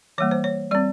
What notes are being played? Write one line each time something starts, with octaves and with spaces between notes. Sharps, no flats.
E3 G3 A#3 C#5
C5
C#5
G3 C4 D5